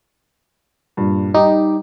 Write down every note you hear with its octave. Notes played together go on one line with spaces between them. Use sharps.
G2 A#2
G3 D#4 G4 D6